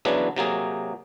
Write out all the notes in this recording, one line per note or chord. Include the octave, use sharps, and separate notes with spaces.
C#3 E3 F#3 B3 D4
C3 F#3 A#3 G#4